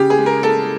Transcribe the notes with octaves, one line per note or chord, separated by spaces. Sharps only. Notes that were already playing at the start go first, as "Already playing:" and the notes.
Already playing: C#3 G4
G#4
G#3
A#4
G#3 A4